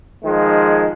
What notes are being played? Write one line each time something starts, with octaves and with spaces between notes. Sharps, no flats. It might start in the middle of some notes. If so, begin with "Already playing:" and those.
D#3 F3 G#3